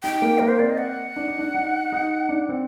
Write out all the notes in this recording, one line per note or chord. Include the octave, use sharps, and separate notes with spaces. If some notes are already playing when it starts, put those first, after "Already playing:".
D#4 G5
A#3
A#3 A#4
C5
C4 D5
D#5
F#5
D4
D#4
D4
D#4
D#4
D4
C4